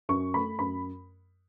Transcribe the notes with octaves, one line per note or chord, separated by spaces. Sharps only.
F#2 C#6
A3 B5
F#2 B5